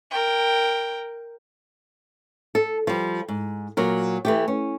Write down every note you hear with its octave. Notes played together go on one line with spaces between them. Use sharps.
A#4 G5
A4
F3 G3
G#2
A#2 F#3 A#4
E3 A3 G4
C#4